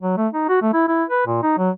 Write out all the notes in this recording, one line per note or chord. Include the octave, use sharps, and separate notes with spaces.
F#3
A3
D#4
F#4
A3
E4
E4
B4
A#2
D#4
F#3